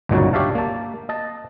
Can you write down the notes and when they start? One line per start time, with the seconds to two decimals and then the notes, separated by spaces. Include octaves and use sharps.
0.09 G1 C#2 A#2 F#3 D#4 F#4
0.33 D4 G4 C#5 E5 F5 A5
0.55 A#3 A5
1.09 D#5 A5